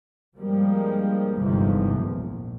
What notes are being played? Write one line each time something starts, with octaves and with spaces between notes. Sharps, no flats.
G2 F3 G3 G#3 A#3
G1 E2 G#2 C3 E3 F3
A#1